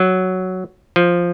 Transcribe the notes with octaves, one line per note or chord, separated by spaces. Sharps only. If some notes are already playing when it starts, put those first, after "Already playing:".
Already playing: F#3
F3